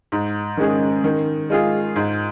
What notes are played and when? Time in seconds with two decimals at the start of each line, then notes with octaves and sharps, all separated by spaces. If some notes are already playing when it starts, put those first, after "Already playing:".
0.12 G#2
0.57 D#3 G#3 C#4 G#4
1.04 D#3
1.50 G#3 F4 G#4
1.96 G#2